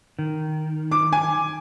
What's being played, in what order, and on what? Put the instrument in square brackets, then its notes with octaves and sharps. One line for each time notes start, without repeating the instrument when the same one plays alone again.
[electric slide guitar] D#3
[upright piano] D6
G#5